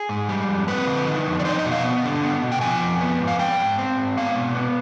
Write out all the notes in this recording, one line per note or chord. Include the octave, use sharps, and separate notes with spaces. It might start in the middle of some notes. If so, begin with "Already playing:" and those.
Already playing: G#4
G#2
G3
F2
C4 B4
D3
D#3
F2
D5
D#4 C5
D#5
B2
F5
B3
D3
B3
B2
G5
F3 G#5
F2
B3
G#2
F5
G#3 G5
G#2
C4
G#2
B3 F5
B2
B3